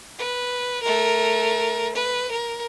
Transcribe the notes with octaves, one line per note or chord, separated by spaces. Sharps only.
B4
A3 A#4
B4
A#4